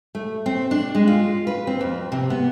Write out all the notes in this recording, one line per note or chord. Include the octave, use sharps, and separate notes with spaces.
A3
C4
D4
G#3
F4
B4
C4
F2
C3
B3